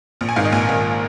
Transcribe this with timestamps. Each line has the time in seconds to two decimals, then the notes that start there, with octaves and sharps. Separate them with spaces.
0.21 A#1
0.29 G#5
0.36 G#2 D#3 F5
0.45 D#5
0.52 A#1 G#5
0.69 G#2 D#3